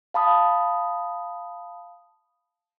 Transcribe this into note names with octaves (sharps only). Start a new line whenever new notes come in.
F5 A5 B5 D#6